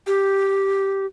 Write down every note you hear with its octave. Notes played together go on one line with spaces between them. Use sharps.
G4